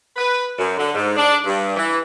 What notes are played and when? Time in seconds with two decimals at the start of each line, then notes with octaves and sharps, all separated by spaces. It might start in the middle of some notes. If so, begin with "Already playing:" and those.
0.16 B4
0.57 F#2
0.77 D3
0.94 G#2
1.16 D4
1.46 G2
1.77 E3